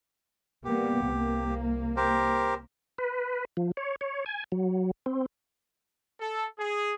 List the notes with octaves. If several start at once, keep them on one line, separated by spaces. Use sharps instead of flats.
G3 A#3 B3 G4
C2 A#3
G4 A#4 C5
B4
F3
C#5
C#5
G#5
F#3
C4
A4
G#4